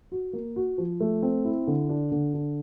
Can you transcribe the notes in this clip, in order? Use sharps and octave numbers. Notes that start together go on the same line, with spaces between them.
F#4
A#3
F#4
F3
A3
C4
E4
D3
D4
D3
D4